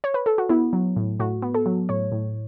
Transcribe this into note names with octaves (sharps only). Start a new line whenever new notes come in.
C#5
B4
A4
F#4
B3 E4
F#3
A2
A2 F#4
B3
A4
F#3
A2 C#5
A2